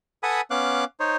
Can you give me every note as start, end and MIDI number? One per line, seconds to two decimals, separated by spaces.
0.23 0.41 69
0.23 0.41 71
0.23 0.41 78
0.23 0.41 80
0.23 0.41 83
0.23 0.41 87
0.51 0.84 59
0.51 0.84 61
0.51 0.84 77
0.51 0.84 86
0.51 0.84 90
1.00 1.17 63
1.00 1.17 72
1.00 1.17 73